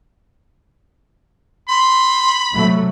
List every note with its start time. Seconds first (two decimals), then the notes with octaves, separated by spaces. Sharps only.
1.69 B5 C6
2.53 C3 F#3 A3